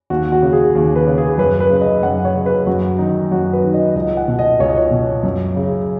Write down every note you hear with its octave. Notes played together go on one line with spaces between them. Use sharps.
D#2 F#4
F#4
C#3
G#4
D#2
B4
C#3
G#4
F#2 B4
B4
C#3
D#5
F#2 F#5
C#5
C#3
B4
F#2 F#4
D#3 D#4
F#2 F#4
B4
D#3
D#5
C#2 D#5
F#5
B2
D#5
C#2 C#5
D#5
C#5
B2
F#2
C#3